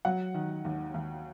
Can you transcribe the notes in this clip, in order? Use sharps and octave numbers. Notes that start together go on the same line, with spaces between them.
F#3 F#5
D#3
D#2
D#2